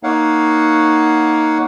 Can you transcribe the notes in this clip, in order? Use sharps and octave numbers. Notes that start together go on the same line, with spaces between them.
A#3 D#4 C#5 F5 F#5